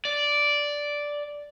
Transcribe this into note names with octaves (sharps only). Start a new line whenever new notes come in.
D5